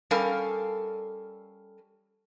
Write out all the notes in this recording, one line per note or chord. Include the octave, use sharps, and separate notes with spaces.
G3 C#4 A4 A#4 F5